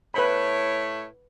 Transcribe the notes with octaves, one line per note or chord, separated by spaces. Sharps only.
A2 E4 B4 C#5 B5